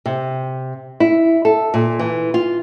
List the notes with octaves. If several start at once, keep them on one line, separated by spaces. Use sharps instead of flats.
C3
E4
A4
A#2
E3
F4